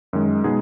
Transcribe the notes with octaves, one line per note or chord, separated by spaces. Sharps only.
F#2 D#3 G#3
B2 G#3 B3 D#4 G#4